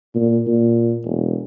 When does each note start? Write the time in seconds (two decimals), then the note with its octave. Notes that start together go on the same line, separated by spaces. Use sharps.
0.15 A#2
0.47 A#2
1.05 E1